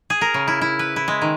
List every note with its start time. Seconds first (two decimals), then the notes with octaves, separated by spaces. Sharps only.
0.10 G#4
0.21 A#4
0.34 C#3
0.48 E4
0.61 E4
0.79 B4
0.96 E4
1.08 G#3
1.22 D#3